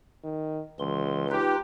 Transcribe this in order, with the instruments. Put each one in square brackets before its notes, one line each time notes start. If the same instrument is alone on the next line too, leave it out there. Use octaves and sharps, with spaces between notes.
[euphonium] D#3
[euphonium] C#2 [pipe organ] E3 C6
[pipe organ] D#4 F4 B4 [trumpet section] G4